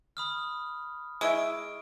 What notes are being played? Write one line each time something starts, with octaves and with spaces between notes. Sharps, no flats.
B5 D#6 F6
G#3 E4 E5 C#6 E6 D7